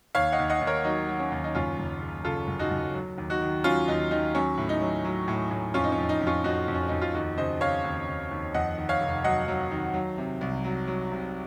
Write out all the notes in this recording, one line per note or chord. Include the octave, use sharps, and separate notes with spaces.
D#2 C#5 F5
D#5 F#5
D#2
D#5 F#5
D#2
A#4 C#5
F#3 D#4
F#3
C#4
D#2
D#4
F#1 C#4 F4
F#1
C#3
C#3 F4 A4
F#1
D#4 F#4
F#1
F#3
D#2
D#4 F#4
D#3
F#3 C#4 F4
D#2 D#4
D#3 D#4
F#3 C#4
A2
D#4
F#3
F#3
A2
A2
F2 C#4 F4
D#4
C#4
F2
D#4
F2
C#4 F4
F2 D#4 F#4
F2
C#4
F2 D#4
F4
D#2 D#4 F#4
C#3 C5 D#5
C#3 C#5 F5
D#2
D#2
D#2
F2 D#5 F#5
D#3
C#5 F5
F1
F#3 D#5 F#5
F#3
D#3
F#3
C3
C2
F#3
F#3
C3